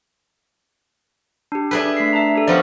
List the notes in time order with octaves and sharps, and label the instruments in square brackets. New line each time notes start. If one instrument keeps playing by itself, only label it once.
[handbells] D4 G4
[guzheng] D4 G#4 B4 [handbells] A4 E5
[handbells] A3 B6 C7
E5 A5 A#5
G4 A4
[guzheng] F3 B3 C#4 [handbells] D5 F5